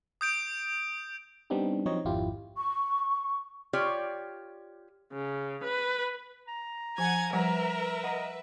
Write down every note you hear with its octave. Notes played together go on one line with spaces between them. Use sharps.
D#6 G6 D7
G3 B3 C4 D4 D#4 G4
F3 F#3 C4 D#4 C#5 D#5
G#1 F2 E4 F4 G4
C#6
F4 G4 C#5 D5
C#3
B4
A#5
F3 F#5 G#5 G#6
F3 G3 A#4 B4 E5 F#5
D#5 F#5 A#5